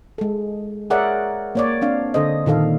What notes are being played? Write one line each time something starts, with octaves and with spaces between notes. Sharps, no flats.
G#3 A4
G#4 A#4 C#5 D5 E5 F#5
A#3 C#5 D5
C4 D4 F5
D3 A4 C5 D#5
A#2 D#3 A4 F5